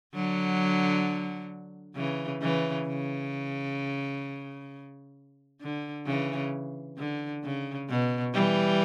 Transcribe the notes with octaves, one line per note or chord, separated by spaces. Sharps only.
D3 F#3
C#3 E3
C#3 E3
C#3
D3
C#3 E3
D3
C#3
B2
E3 G3